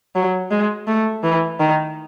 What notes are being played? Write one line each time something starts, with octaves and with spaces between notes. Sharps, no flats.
F#3
G#3
A3
E3
D#3